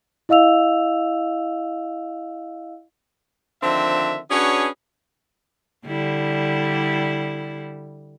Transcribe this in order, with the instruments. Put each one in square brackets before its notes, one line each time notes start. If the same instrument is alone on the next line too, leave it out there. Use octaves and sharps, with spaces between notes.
[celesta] E4 D#5 F5 E6 F7
[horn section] D3 D#3 F3 C4 D4 E5
C#4 D4 F#4 G#4 B4 C#5
[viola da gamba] D3 G3 E4